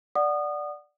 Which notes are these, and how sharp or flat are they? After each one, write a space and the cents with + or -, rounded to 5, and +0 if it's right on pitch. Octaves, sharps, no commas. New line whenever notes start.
D5 +0 F#5 +0 D#6 -25